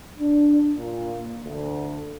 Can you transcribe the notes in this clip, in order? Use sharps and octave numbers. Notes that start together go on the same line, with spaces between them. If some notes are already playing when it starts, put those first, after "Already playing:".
D4
A#2
D2